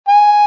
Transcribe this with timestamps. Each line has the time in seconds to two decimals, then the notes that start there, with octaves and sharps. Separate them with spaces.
0.08 G#5